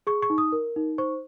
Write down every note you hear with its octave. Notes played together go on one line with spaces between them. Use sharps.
G#4 C#6
C#6
D#4
D#6
A#4
D#4
C5 C#6